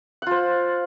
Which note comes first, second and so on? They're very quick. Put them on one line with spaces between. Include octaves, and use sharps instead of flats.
F#5 F4 C5